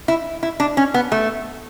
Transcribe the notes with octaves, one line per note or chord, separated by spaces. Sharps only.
E4
E4
D4
C#4
B3
A3